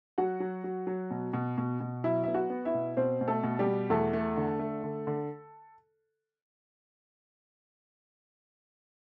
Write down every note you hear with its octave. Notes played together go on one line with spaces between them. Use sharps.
F#3 F#4 F#5
F#3
F#3
F#3
B2
B2
B2
B2
F#3 E4 E5
B3 E5
F#4 F#5
B3
E4 E5
B2
B2 C4 C5
B2
A3 A4
B2
G3 G4
B2
E2 A3 A4
A3
D3
A3
D3
D3